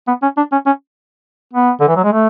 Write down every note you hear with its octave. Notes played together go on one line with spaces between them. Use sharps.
B3
C#4
D4
C#4
C#4
B3
D3
E3
F#3
G#3
A3